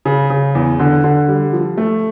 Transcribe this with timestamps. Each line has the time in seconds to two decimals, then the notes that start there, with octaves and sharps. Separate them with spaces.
0.05 C#3
0.30 C#3
0.55 E2
0.79 D3
1.04 D3
1.28 G3
1.53 F3
1.77 A3